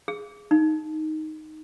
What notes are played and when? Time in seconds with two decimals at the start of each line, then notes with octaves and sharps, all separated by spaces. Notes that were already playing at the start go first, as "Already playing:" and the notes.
0.08 G#4
0.51 D#4